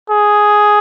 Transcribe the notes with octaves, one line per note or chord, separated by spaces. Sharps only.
G#4